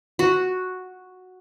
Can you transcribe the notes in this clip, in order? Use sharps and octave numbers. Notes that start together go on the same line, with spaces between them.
F#4